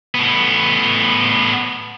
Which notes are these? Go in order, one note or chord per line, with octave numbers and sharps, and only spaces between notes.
A2 B3